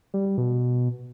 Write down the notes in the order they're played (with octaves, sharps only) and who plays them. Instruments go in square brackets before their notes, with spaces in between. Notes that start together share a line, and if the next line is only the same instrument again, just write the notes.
[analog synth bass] G3
G3
B2